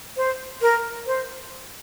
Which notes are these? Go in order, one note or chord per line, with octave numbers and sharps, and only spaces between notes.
C5
A#4
C5